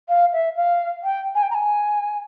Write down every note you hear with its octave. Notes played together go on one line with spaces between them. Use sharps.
F5
E5
F5
G5
G#5
G5
A#5
G#5